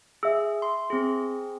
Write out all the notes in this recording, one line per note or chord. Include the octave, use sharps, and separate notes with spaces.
G#4 E5 E6
C6
C4 G#4